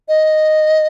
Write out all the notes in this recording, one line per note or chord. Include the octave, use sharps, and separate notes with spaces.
D#5